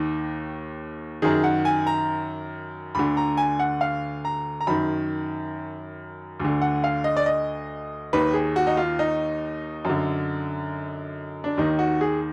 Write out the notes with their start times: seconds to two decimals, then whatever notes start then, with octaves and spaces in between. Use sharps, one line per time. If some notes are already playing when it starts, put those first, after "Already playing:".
Already playing: D#2 D#3
1.22 F#2 D#3 G#4
1.44 F#5
1.65 G#5
1.87 A#5
2.95 D2 D3 B5
3.17 A#5
3.37 G#5
3.60 F#5
3.81 F5
4.25 A#5
4.61 A#5
4.67 F#2 D#3 B5
6.40 D2
6.45 D3
6.62 F#5
6.84 F5
7.04 D#5
7.17 D5
7.26 D#5
8.13 D#2 D#3 B4
8.34 G#4
8.56 F#4
8.67 D#4
8.77 F4
8.99 D#4
9.85 F#2
9.90 D3
11.44 D4
11.57 D#2 D#3 D#4
11.79 F#4
12.01 G#4